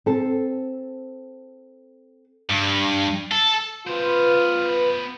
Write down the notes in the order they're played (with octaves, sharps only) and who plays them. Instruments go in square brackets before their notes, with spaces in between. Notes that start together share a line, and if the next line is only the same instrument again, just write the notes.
[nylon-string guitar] C4 A4
[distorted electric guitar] G2
A4
[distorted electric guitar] B3 C5 [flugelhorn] F4 [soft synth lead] B4